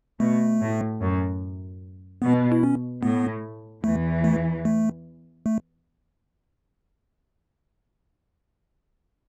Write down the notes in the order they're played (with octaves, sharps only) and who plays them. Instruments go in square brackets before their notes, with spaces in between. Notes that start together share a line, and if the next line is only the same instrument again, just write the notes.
[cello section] B2 [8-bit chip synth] A3
[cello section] A2
F#2
[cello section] B2 [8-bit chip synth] B3
[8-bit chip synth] E4
C#4
[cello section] A2 [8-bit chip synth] B3
[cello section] E2 E3 [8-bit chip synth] A3
[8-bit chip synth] A3
A3
A3